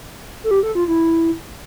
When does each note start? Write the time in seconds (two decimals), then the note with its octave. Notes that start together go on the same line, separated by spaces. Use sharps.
0.44 A4
0.51 G4
0.63 A4
0.75 F4
0.88 E4